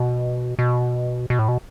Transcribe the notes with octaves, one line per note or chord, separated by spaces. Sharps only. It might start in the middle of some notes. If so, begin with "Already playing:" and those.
Already playing: B2
B2
B2
A2
B2